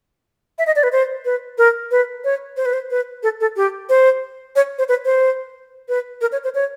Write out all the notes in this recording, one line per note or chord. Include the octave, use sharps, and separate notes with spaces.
E5
D#5
D5
B4
C5
B4
A#4
B4
C#5
C5
B4
C5
B4
A4
A4
G4
C5
C#5
C5
B4
C5
B4
A#4
C#5
C5
C#5